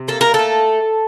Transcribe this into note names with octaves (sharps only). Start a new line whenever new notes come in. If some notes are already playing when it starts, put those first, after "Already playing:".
Already playing: C3
A#3 A4
A#4
A3 A4